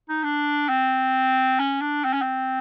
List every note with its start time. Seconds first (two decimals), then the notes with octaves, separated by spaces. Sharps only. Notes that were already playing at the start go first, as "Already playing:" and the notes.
0.09 D#4
0.24 D4
0.69 C4
1.59 C#4
1.81 D4
2.05 C4
2.13 C#4
2.22 C4